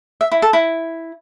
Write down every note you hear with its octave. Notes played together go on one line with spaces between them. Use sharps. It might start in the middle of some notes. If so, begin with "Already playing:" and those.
E5
E4
A4
E4